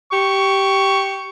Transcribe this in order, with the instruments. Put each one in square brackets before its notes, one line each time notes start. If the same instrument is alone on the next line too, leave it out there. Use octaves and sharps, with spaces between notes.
[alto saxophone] G4 [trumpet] C#6